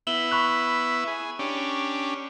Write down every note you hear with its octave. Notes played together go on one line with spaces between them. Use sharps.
B3 E4 E5 F#7 G7
B5 C#6 F#6
G#4
C#4 D4 G4